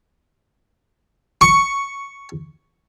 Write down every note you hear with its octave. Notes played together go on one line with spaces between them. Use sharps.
C#6